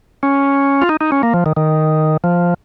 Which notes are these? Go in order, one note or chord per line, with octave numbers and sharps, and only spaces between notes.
C#4
F4
D#4
D#4
C#4
A#3
F3
D#3
D#3
F3